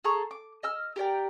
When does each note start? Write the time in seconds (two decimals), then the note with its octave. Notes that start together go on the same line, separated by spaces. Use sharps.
0.04 G#4 A4 A#5 C#6
0.31 D6
0.63 D#5 E6 F6
0.96 G4 A#4 D5 G5